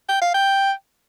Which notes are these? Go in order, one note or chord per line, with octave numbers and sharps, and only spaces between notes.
G5
F5
G5